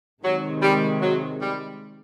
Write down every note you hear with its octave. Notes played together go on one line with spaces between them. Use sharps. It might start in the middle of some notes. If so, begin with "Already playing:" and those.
C3 D#3 F#3 G#3
G3
F#3
G3